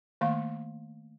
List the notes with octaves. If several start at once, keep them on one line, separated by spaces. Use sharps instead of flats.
D#3 A3 A#3 F5 C6